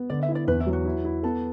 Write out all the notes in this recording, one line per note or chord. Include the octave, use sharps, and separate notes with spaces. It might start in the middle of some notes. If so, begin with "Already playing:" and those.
Already playing: B3
D3 D5
E5
E4
D5
E2 B4
E4
F#3
F#4
E4
E4
B3 A4